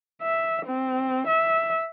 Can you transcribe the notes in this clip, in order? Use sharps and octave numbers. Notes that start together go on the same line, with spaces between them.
E5
C4
E5